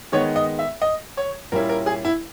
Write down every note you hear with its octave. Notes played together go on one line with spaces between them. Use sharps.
D#3 G#3 B3 D#4 C#5
D#5
E5
D#5
C#5
A#2 G3 A#3 C#4 E4 A#4
A#4
G#4
E4